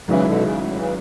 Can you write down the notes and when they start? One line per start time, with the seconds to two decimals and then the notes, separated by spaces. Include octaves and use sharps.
0.08 G#1 G#2 C#3 E3 F#3 C#4 E4
0.25 B2 D3
0.42 C#3
0.59 A2
0.76 C#3 E3